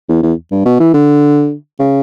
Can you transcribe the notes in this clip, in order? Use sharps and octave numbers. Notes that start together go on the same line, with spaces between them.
E2
E2
G2
B2
E3
D3
C#3